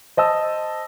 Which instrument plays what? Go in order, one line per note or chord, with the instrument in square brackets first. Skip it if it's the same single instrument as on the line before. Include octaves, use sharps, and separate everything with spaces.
[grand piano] C5 D#5 A5 E6